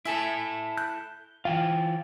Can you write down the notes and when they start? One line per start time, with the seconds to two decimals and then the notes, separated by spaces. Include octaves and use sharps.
0.05 E4 A4 E5 G#5
0.77 F#6 G6
1.45 E3 F4 F5 G5